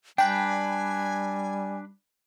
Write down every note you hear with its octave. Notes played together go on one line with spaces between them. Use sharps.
G3 D4 B4 G5 G#5